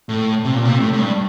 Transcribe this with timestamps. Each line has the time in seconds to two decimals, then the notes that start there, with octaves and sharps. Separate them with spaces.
0.09 A2
0.45 C3
0.54 A#2
0.65 C3
0.80 A2
0.93 A2
0.98 G2